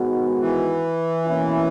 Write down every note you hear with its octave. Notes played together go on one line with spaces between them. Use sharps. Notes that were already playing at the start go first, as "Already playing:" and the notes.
Already playing: G#2 D#3 G#3 B3 F#4
E3
B2 A#3 C#4 E4